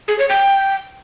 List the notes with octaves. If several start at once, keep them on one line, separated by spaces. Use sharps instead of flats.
G#4
C#5
G5